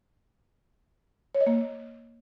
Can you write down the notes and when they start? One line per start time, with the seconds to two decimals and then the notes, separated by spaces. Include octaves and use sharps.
1.35 C#5
1.41 D#5
1.47 A#3